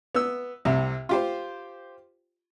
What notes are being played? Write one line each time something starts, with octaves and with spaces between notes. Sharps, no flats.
B3 E6
C2 C3
F4 G4 C5